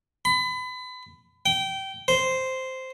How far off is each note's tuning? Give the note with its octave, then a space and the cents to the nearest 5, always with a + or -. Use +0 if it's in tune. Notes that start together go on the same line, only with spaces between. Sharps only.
B5 +30
G5 -20
C5 -5